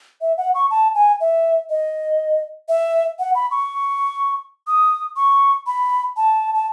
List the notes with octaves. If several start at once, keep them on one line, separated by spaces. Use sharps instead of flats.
E5
F#5
C#6
A5
G#5
E5
D#5
E5
F#5
B5
C#6
D#6
C#6
B5
A5
A5